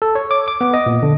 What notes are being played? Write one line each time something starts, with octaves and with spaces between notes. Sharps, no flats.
A4
C#5
D6
D6
B3
D#5
A#2
D3